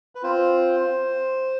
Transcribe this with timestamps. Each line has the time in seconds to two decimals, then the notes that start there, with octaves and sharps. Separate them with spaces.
0.15 B4
0.23 C4 F4 C5